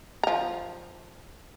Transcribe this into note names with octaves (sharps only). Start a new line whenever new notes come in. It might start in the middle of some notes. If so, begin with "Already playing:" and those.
F3 A#5